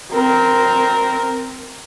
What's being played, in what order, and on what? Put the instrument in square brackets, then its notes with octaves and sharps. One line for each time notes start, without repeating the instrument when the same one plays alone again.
[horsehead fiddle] C4 A#4